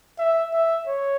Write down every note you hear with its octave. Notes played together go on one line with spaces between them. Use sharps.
E5
E5
C#5